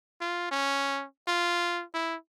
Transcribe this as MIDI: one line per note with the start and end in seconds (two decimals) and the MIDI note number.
0.21 0.49 65
0.51 1.05 61
1.28 1.83 65
1.94 2.15 64